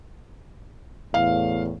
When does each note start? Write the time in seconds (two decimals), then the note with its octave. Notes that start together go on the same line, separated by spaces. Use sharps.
1.14 E2 A2 F5